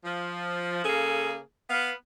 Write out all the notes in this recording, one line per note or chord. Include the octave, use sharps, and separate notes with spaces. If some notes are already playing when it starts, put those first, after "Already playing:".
F3
C#3 A#3 G#4 A4
B3 F5